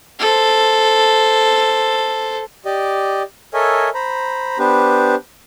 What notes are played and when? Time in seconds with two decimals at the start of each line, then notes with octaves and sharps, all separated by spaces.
0.20 A4 C5
2.65 G4 D5 D#5
3.54 A4 A#4 C#5 D#5 E5 G#5
3.95 C5 A#5 B5
4.59 B3 D4 G4 B4 C5